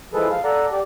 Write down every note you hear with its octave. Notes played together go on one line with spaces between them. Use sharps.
E3 F3 G#3 G#4 A4 B4
F5
A4 D5 F#5 A#5
G4 D5